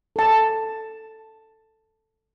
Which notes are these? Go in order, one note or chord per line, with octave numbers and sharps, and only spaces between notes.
A4 A5